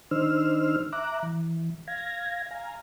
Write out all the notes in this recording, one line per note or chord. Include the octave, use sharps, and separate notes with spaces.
D#3 D4 D#4 C5 E6 F6
E5 A#5 D6 F#6
E3
F5 G#6 A#6
F5 G#5 A#5